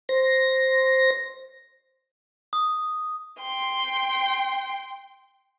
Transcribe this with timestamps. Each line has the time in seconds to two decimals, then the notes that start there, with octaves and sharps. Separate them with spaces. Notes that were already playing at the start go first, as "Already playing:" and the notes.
0.09 C5 A#6
2.53 D#6
3.40 G5 C6